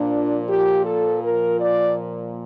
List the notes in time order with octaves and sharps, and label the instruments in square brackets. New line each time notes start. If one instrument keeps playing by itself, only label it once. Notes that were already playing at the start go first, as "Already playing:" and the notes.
Already playing: [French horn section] A#2 F3 D4
G4
A4
A#4
D5